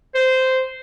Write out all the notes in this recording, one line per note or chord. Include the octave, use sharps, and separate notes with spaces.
C5